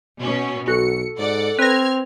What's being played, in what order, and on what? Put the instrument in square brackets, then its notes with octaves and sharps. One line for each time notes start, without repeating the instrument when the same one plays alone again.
[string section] B2 C#4
[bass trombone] B1 [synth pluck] F#4 [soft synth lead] A4 [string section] C#7
[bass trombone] G#2 [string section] D5 F#5
[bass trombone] C4 [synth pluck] B4 A#6 [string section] F6 G#6